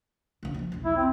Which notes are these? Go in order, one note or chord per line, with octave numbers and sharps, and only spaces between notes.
F#1 C2
F3 A#3
B1 E2
E4
C4